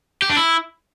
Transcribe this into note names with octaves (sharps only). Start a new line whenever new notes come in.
G4
D4
E4